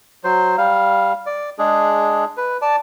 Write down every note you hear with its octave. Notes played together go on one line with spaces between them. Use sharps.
F#3 C5
G3 F5
D5
G#3 D4 G#4
B4
D5 A5